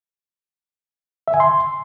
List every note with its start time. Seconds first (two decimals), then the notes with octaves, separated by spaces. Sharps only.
1.28 E5
1.34 G#5
1.40 C6